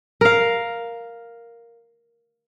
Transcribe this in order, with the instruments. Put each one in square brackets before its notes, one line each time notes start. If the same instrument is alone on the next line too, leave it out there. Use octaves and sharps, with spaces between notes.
[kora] A#4 F5